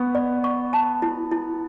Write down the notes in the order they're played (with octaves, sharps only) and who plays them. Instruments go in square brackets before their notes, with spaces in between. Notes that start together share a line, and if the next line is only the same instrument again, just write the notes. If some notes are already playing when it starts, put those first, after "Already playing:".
Already playing: [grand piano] B3 [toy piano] C#6
[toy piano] D5
C#6
A5
E4
E4